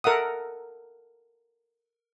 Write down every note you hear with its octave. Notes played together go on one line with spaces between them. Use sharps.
A4 A#4 E5 F#5 D#6